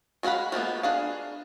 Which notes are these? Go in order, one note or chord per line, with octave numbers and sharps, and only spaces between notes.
G#3 F#4 F5 F#5 B5
F3 G#3 A#3 B3
D4 G#4 F5